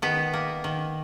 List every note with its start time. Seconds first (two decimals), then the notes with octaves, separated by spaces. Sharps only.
0.02 D#3 B3
0.33 A#3
0.64 D#3